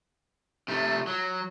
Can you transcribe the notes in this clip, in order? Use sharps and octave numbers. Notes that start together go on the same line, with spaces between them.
C3 A3
F#3